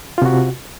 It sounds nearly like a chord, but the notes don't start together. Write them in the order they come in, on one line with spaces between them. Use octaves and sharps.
F4 C3 F#4